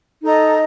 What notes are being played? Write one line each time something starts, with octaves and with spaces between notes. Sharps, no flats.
D#4 A4 D#5 A#5